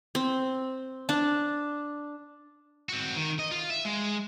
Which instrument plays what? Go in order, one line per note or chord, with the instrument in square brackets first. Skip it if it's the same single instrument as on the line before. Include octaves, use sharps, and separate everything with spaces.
[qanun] C4
D4 A5
[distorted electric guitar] C4 F#4
D#3
D#5
F4
E5
G#3